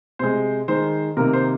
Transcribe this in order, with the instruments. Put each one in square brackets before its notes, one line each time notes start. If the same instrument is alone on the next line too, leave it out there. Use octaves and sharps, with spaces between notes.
[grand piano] C3 G#3 C5
D#3 G#3 C5
C3 D#3 A#3 A#4
C5